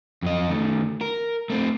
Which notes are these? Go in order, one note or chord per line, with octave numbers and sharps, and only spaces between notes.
F2 D#5
D#3 A3
A#4
A3 C4